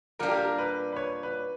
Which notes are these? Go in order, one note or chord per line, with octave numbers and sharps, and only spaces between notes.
A#2 G3 A#3 D4 A#4
G4
A#4
B4
B4
C#5
B4